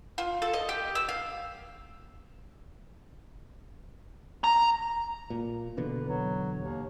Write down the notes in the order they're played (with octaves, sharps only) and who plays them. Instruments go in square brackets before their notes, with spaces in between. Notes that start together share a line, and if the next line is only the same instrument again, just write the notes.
[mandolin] F4
A4
D#5
G4
E6
F5
[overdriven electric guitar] A#5
[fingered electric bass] A#2
[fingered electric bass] E2 B2 D3 [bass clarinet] B4
[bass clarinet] F#3
D#2